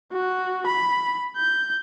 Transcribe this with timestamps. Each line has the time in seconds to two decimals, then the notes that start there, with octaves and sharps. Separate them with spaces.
0.12 F#4
0.67 B5
1.37 G6